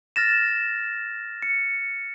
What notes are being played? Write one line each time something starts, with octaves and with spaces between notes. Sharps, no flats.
F6 A6 A#6 E7
C#7